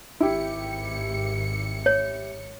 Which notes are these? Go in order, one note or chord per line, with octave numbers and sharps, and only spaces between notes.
G#1 E4 G4 C#7
C#5